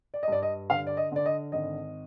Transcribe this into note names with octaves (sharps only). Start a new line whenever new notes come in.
D5
D#5
G2 D5
D#5
D3 F5
D5
D#5
D3 D5
D#5
G#1 D#5